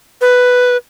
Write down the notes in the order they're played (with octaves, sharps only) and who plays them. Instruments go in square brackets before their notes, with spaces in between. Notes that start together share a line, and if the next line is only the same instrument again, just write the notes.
[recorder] B4